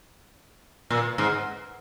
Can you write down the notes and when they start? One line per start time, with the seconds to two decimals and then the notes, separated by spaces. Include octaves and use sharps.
0.90 A#2
1.18 G#2